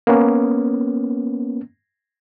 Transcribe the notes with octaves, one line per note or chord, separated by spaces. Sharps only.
A#3 B3 C#4